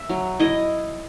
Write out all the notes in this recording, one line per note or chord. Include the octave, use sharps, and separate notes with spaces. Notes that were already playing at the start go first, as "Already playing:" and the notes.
Already playing: E5
F#3
E4 D#5